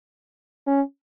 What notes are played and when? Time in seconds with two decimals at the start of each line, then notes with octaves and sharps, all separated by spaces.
0.67 C#4